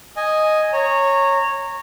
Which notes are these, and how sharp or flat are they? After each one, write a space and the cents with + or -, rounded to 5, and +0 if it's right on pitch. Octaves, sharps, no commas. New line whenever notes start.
D#5 +0 G#5 +0
C#5 -10 A#5 -20